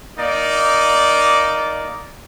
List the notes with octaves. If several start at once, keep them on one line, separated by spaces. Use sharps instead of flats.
A#3 D#4 D5